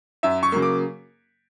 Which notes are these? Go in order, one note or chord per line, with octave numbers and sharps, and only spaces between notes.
F#2 E5
C#6
C#3 F#3 A#3
D6